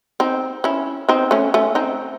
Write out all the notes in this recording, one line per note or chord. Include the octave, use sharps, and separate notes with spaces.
C4 D#4
C#4 E4
C4 D#4
A3 C#4
A3 C#4
C4 D#4